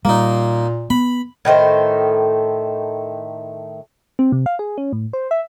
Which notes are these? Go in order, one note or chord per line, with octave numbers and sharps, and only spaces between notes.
A#2 G3 A#3 D#4
B3 B5
A2 D#3 A3 C5
C4
C3
F5
G#4
C#4
A2
C5
E5